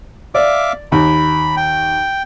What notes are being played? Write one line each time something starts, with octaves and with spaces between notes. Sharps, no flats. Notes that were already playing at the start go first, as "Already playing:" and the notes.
D5 E5 F5 D6
D#2 B5
G5